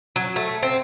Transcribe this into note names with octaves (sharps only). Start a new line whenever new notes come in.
F#3
A3
C4